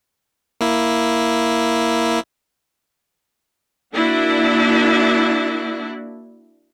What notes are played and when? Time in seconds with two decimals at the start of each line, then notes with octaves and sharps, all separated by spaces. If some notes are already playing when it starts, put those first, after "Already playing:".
0.61 A#3 E4
3.93 A#3 D4 E4 F#4